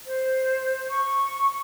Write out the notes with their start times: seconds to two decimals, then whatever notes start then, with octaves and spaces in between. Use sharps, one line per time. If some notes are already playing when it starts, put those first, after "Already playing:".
0.06 C5
0.90 C#6